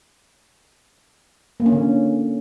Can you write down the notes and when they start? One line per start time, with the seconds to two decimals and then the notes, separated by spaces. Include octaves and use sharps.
1.60 A#3
1.66 C#4
1.72 D3